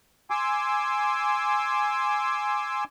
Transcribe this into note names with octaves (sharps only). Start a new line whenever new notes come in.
G#5 C6 D6 E6